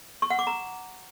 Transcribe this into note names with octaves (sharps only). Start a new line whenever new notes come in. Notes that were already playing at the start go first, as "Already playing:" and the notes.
C#6
F#5
D6
A#5